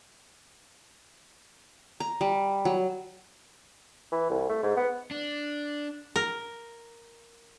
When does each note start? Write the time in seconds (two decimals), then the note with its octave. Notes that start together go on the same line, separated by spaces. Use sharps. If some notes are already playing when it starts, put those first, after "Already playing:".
2.00 A#5
2.21 G3
2.65 F#3
4.12 E3
4.30 C2
4.49 A3
4.63 G#2
4.77 B3
5.11 D4
6.16 A#4